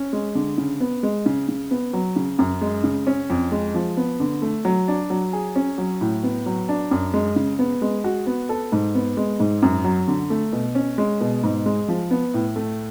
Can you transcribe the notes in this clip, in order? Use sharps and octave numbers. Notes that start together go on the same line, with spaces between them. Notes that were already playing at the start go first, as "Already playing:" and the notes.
Already playing: C#4
G#3
D3
C#3
B3
G#3
C#3
C#3
B3
F#3
C#3
F#2
G#3
C#3
C#4
F2
G#3
F3
B3
D3
A3
F#3
D4
F#3
G#4
C#4
F#3
A2
B3
F#3
D4
F#2
G#3
C#3
B3
G#3
F#4
B3
A4
G#2
B3
G#3
G#2
F#2
F#3
D3
A3
B2
C#4
G#3
B2
G#2
G#3
F3
B3
A2
A3